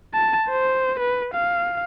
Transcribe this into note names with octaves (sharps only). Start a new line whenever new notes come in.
A5
C5
B4
F5